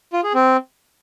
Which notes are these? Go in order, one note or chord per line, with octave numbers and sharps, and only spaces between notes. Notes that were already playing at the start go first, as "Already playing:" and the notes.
F4
G#4
C4